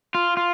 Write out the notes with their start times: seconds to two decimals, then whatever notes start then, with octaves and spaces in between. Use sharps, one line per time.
0.15 F4
0.37 F4